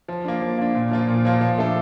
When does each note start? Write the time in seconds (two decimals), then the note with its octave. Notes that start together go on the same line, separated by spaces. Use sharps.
0.08 F3
0.25 A#3 D4
0.42 F3
0.58 A#3 D4
0.75 A#2
0.91 F3 A#3 F4
1.08 A#2
1.25 F3 A#3 F4
1.41 F3
1.58 A3 D4 A4